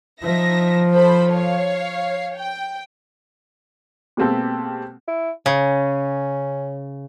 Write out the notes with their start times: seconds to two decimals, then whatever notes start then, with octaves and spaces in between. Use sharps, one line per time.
0.22 F3 D#4 E5 A#6
0.93 A4 C5 B5
1.32 C#5 F5
2.37 G5
4.17 B2 G#3 A#3 C4 G4 A4
5.07 E4
5.46 C#3 C#4